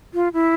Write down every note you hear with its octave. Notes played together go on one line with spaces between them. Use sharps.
F4
E4